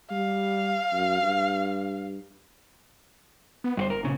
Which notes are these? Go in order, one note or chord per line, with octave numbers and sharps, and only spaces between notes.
G3 F5
F#2
G2
B3
G1 G2 F#4 C5
A#4
A#2 C#3